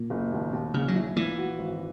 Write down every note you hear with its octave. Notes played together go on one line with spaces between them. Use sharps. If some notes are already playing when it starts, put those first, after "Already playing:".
Already playing: A#2
F#1
D#2
D#2
A#1 C#3
F#3
E4
A#2 E3
F#4
G#1